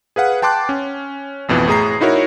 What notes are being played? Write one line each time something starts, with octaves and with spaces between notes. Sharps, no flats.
G#4 B4 F5 F#5
G5 A5 C6 D6 F#6
C#4
A1 F2 B2 E3
A2 G#4 A#5 C7
D#4 E4 F#4 A#4 C#5